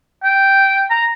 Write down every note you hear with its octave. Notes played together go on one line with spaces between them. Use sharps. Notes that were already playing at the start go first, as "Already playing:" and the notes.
G5
A#5